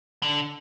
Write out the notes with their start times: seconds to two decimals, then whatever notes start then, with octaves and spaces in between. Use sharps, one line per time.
0.23 D3